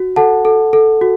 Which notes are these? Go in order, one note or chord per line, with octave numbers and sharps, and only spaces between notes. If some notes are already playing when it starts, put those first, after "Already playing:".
Already playing: F#4
A4 F#5 A5
A4
A4
F#4